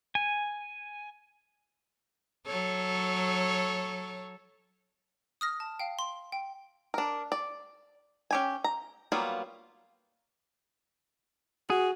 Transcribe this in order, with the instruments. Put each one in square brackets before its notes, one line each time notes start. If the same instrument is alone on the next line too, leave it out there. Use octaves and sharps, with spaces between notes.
[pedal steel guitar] G#5
[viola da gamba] F#3 A4 C#5
[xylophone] D#6 F6 A#6
A5
F5 G5
C6
G5
[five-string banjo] D4 A#4
D5
C#4 G4 G#5
A#5
F#3 G3 A#3 B3 F4
[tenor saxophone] F#4 [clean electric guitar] G#4